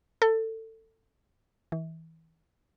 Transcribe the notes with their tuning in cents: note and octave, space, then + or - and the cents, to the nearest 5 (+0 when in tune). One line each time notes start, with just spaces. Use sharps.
A4 +20
E3 -30